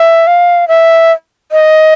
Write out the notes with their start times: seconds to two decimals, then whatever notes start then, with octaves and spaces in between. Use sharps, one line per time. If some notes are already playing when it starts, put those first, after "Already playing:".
Already playing: E5
0.27 F5
0.68 E5
1.52 D#5